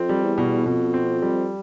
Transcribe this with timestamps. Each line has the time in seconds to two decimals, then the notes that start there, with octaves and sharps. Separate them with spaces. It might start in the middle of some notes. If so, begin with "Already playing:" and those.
Already playing: F2 C4
0.09 G3
0.23 E2
0.38 B2
0.66 F2 B2
0.94 C4
1.22 G3